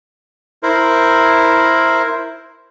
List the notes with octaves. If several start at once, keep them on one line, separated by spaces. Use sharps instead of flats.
E4 A#4 C5